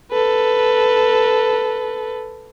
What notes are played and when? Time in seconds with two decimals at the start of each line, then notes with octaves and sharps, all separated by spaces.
0.11 A4 B4